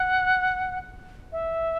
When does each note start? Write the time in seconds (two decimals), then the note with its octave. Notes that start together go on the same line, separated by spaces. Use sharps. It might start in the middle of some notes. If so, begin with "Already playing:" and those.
Already playing: F#5
1.32 E5